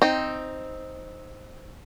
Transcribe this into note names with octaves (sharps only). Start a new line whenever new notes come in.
C4 D#4